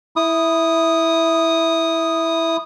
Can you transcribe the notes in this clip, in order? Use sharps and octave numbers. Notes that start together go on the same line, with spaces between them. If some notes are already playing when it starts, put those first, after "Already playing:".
E4 D#6